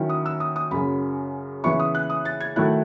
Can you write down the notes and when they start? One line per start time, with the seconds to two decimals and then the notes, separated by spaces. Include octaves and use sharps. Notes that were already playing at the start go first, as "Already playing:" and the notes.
Already playing: D#3 F#3 C#4 E4
0.09 D#6
0.26 E6
0.40 D#6
0.56 D#6
0.71 F#2 C#3 F#3 B5
1.64 C#3 E3 B3 E4 C#6
1.80 D#6
1.95 F#6
2.10 D#6
2.25 A6
2.40 G#6
2.56 D#3 F#3 A3 E4 F#6